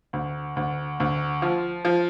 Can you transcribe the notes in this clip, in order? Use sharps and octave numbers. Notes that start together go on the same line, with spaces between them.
D2
D2
D2
F3
F3